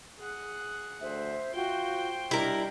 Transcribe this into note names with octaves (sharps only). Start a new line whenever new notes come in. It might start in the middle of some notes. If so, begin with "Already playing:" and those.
G#4 F#5
D2 C5 E5
F4 F#4 C5 G5
G3 D4 E4 A#4 D#5